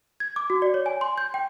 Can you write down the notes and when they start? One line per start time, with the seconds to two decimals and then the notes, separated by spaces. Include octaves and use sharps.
0.20 G#6
0.36 D6
0.50 F#4
0.62 D5
0.74 C#5
0.86 G#5
1.01 C6
1.18 G6
1.34 G5